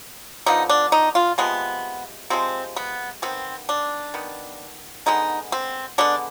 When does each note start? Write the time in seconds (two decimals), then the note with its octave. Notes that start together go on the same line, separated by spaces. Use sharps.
0.46 D3 F3 B3 D#4
0.69 D4
0.92 D#4
1.15 F4
1.38 C3 F3 G#3 B3
2.30 C3 F3 G#3 C4
2.76 B3
3.22 D#3 B3 C4
3.69 D4
4.14 D#3 B3
5.06 D3 G#3 B3 D#4
5.52 C4
5.98 D3 G#3 B3 D4